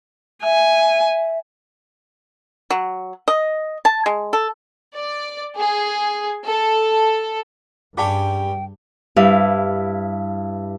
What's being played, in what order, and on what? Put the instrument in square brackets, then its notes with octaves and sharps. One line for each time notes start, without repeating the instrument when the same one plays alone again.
[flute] E5 [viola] G#5
[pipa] F#3
D#5
A5
G#3
A4
[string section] D5
G#4
A4
[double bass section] G2 [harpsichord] G3 C#4 G4 [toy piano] G#4 F5 A5 [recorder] G5
[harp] G2 E4 F5